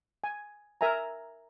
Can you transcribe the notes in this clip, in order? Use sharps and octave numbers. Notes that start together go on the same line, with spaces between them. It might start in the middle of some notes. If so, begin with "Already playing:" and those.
G#5
A#4 E5 G#5 A#5